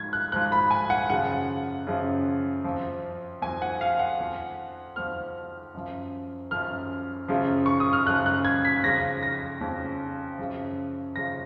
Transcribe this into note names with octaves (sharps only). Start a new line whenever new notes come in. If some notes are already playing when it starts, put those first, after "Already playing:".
Already playing: G#2 F3 G#6
F#6
G#2 F3 F#6
B5
G#5
F#5
F#2 C#3 F3 F#5
F#2 C#3 F3
F2 F3
F2 F3 G#5
F#5
F5
F#5
F2 F3
F2 F3 F6
F#2 F3
F#2 F3 F6
F#2 C#3 F3
C#6
D#6
F6
F#2 C#3 F3 F#6
F#6
G#6
B6
F2 C#3 F3 A#6
A#6
F2 C#3 F3
F#2 C#3 F3
F#2 C#3 F3 A#6